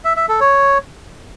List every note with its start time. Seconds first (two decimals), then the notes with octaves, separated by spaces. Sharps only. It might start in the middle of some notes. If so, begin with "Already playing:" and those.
0.05 E5
0.17 E5
0.29 A4
0.41 C#5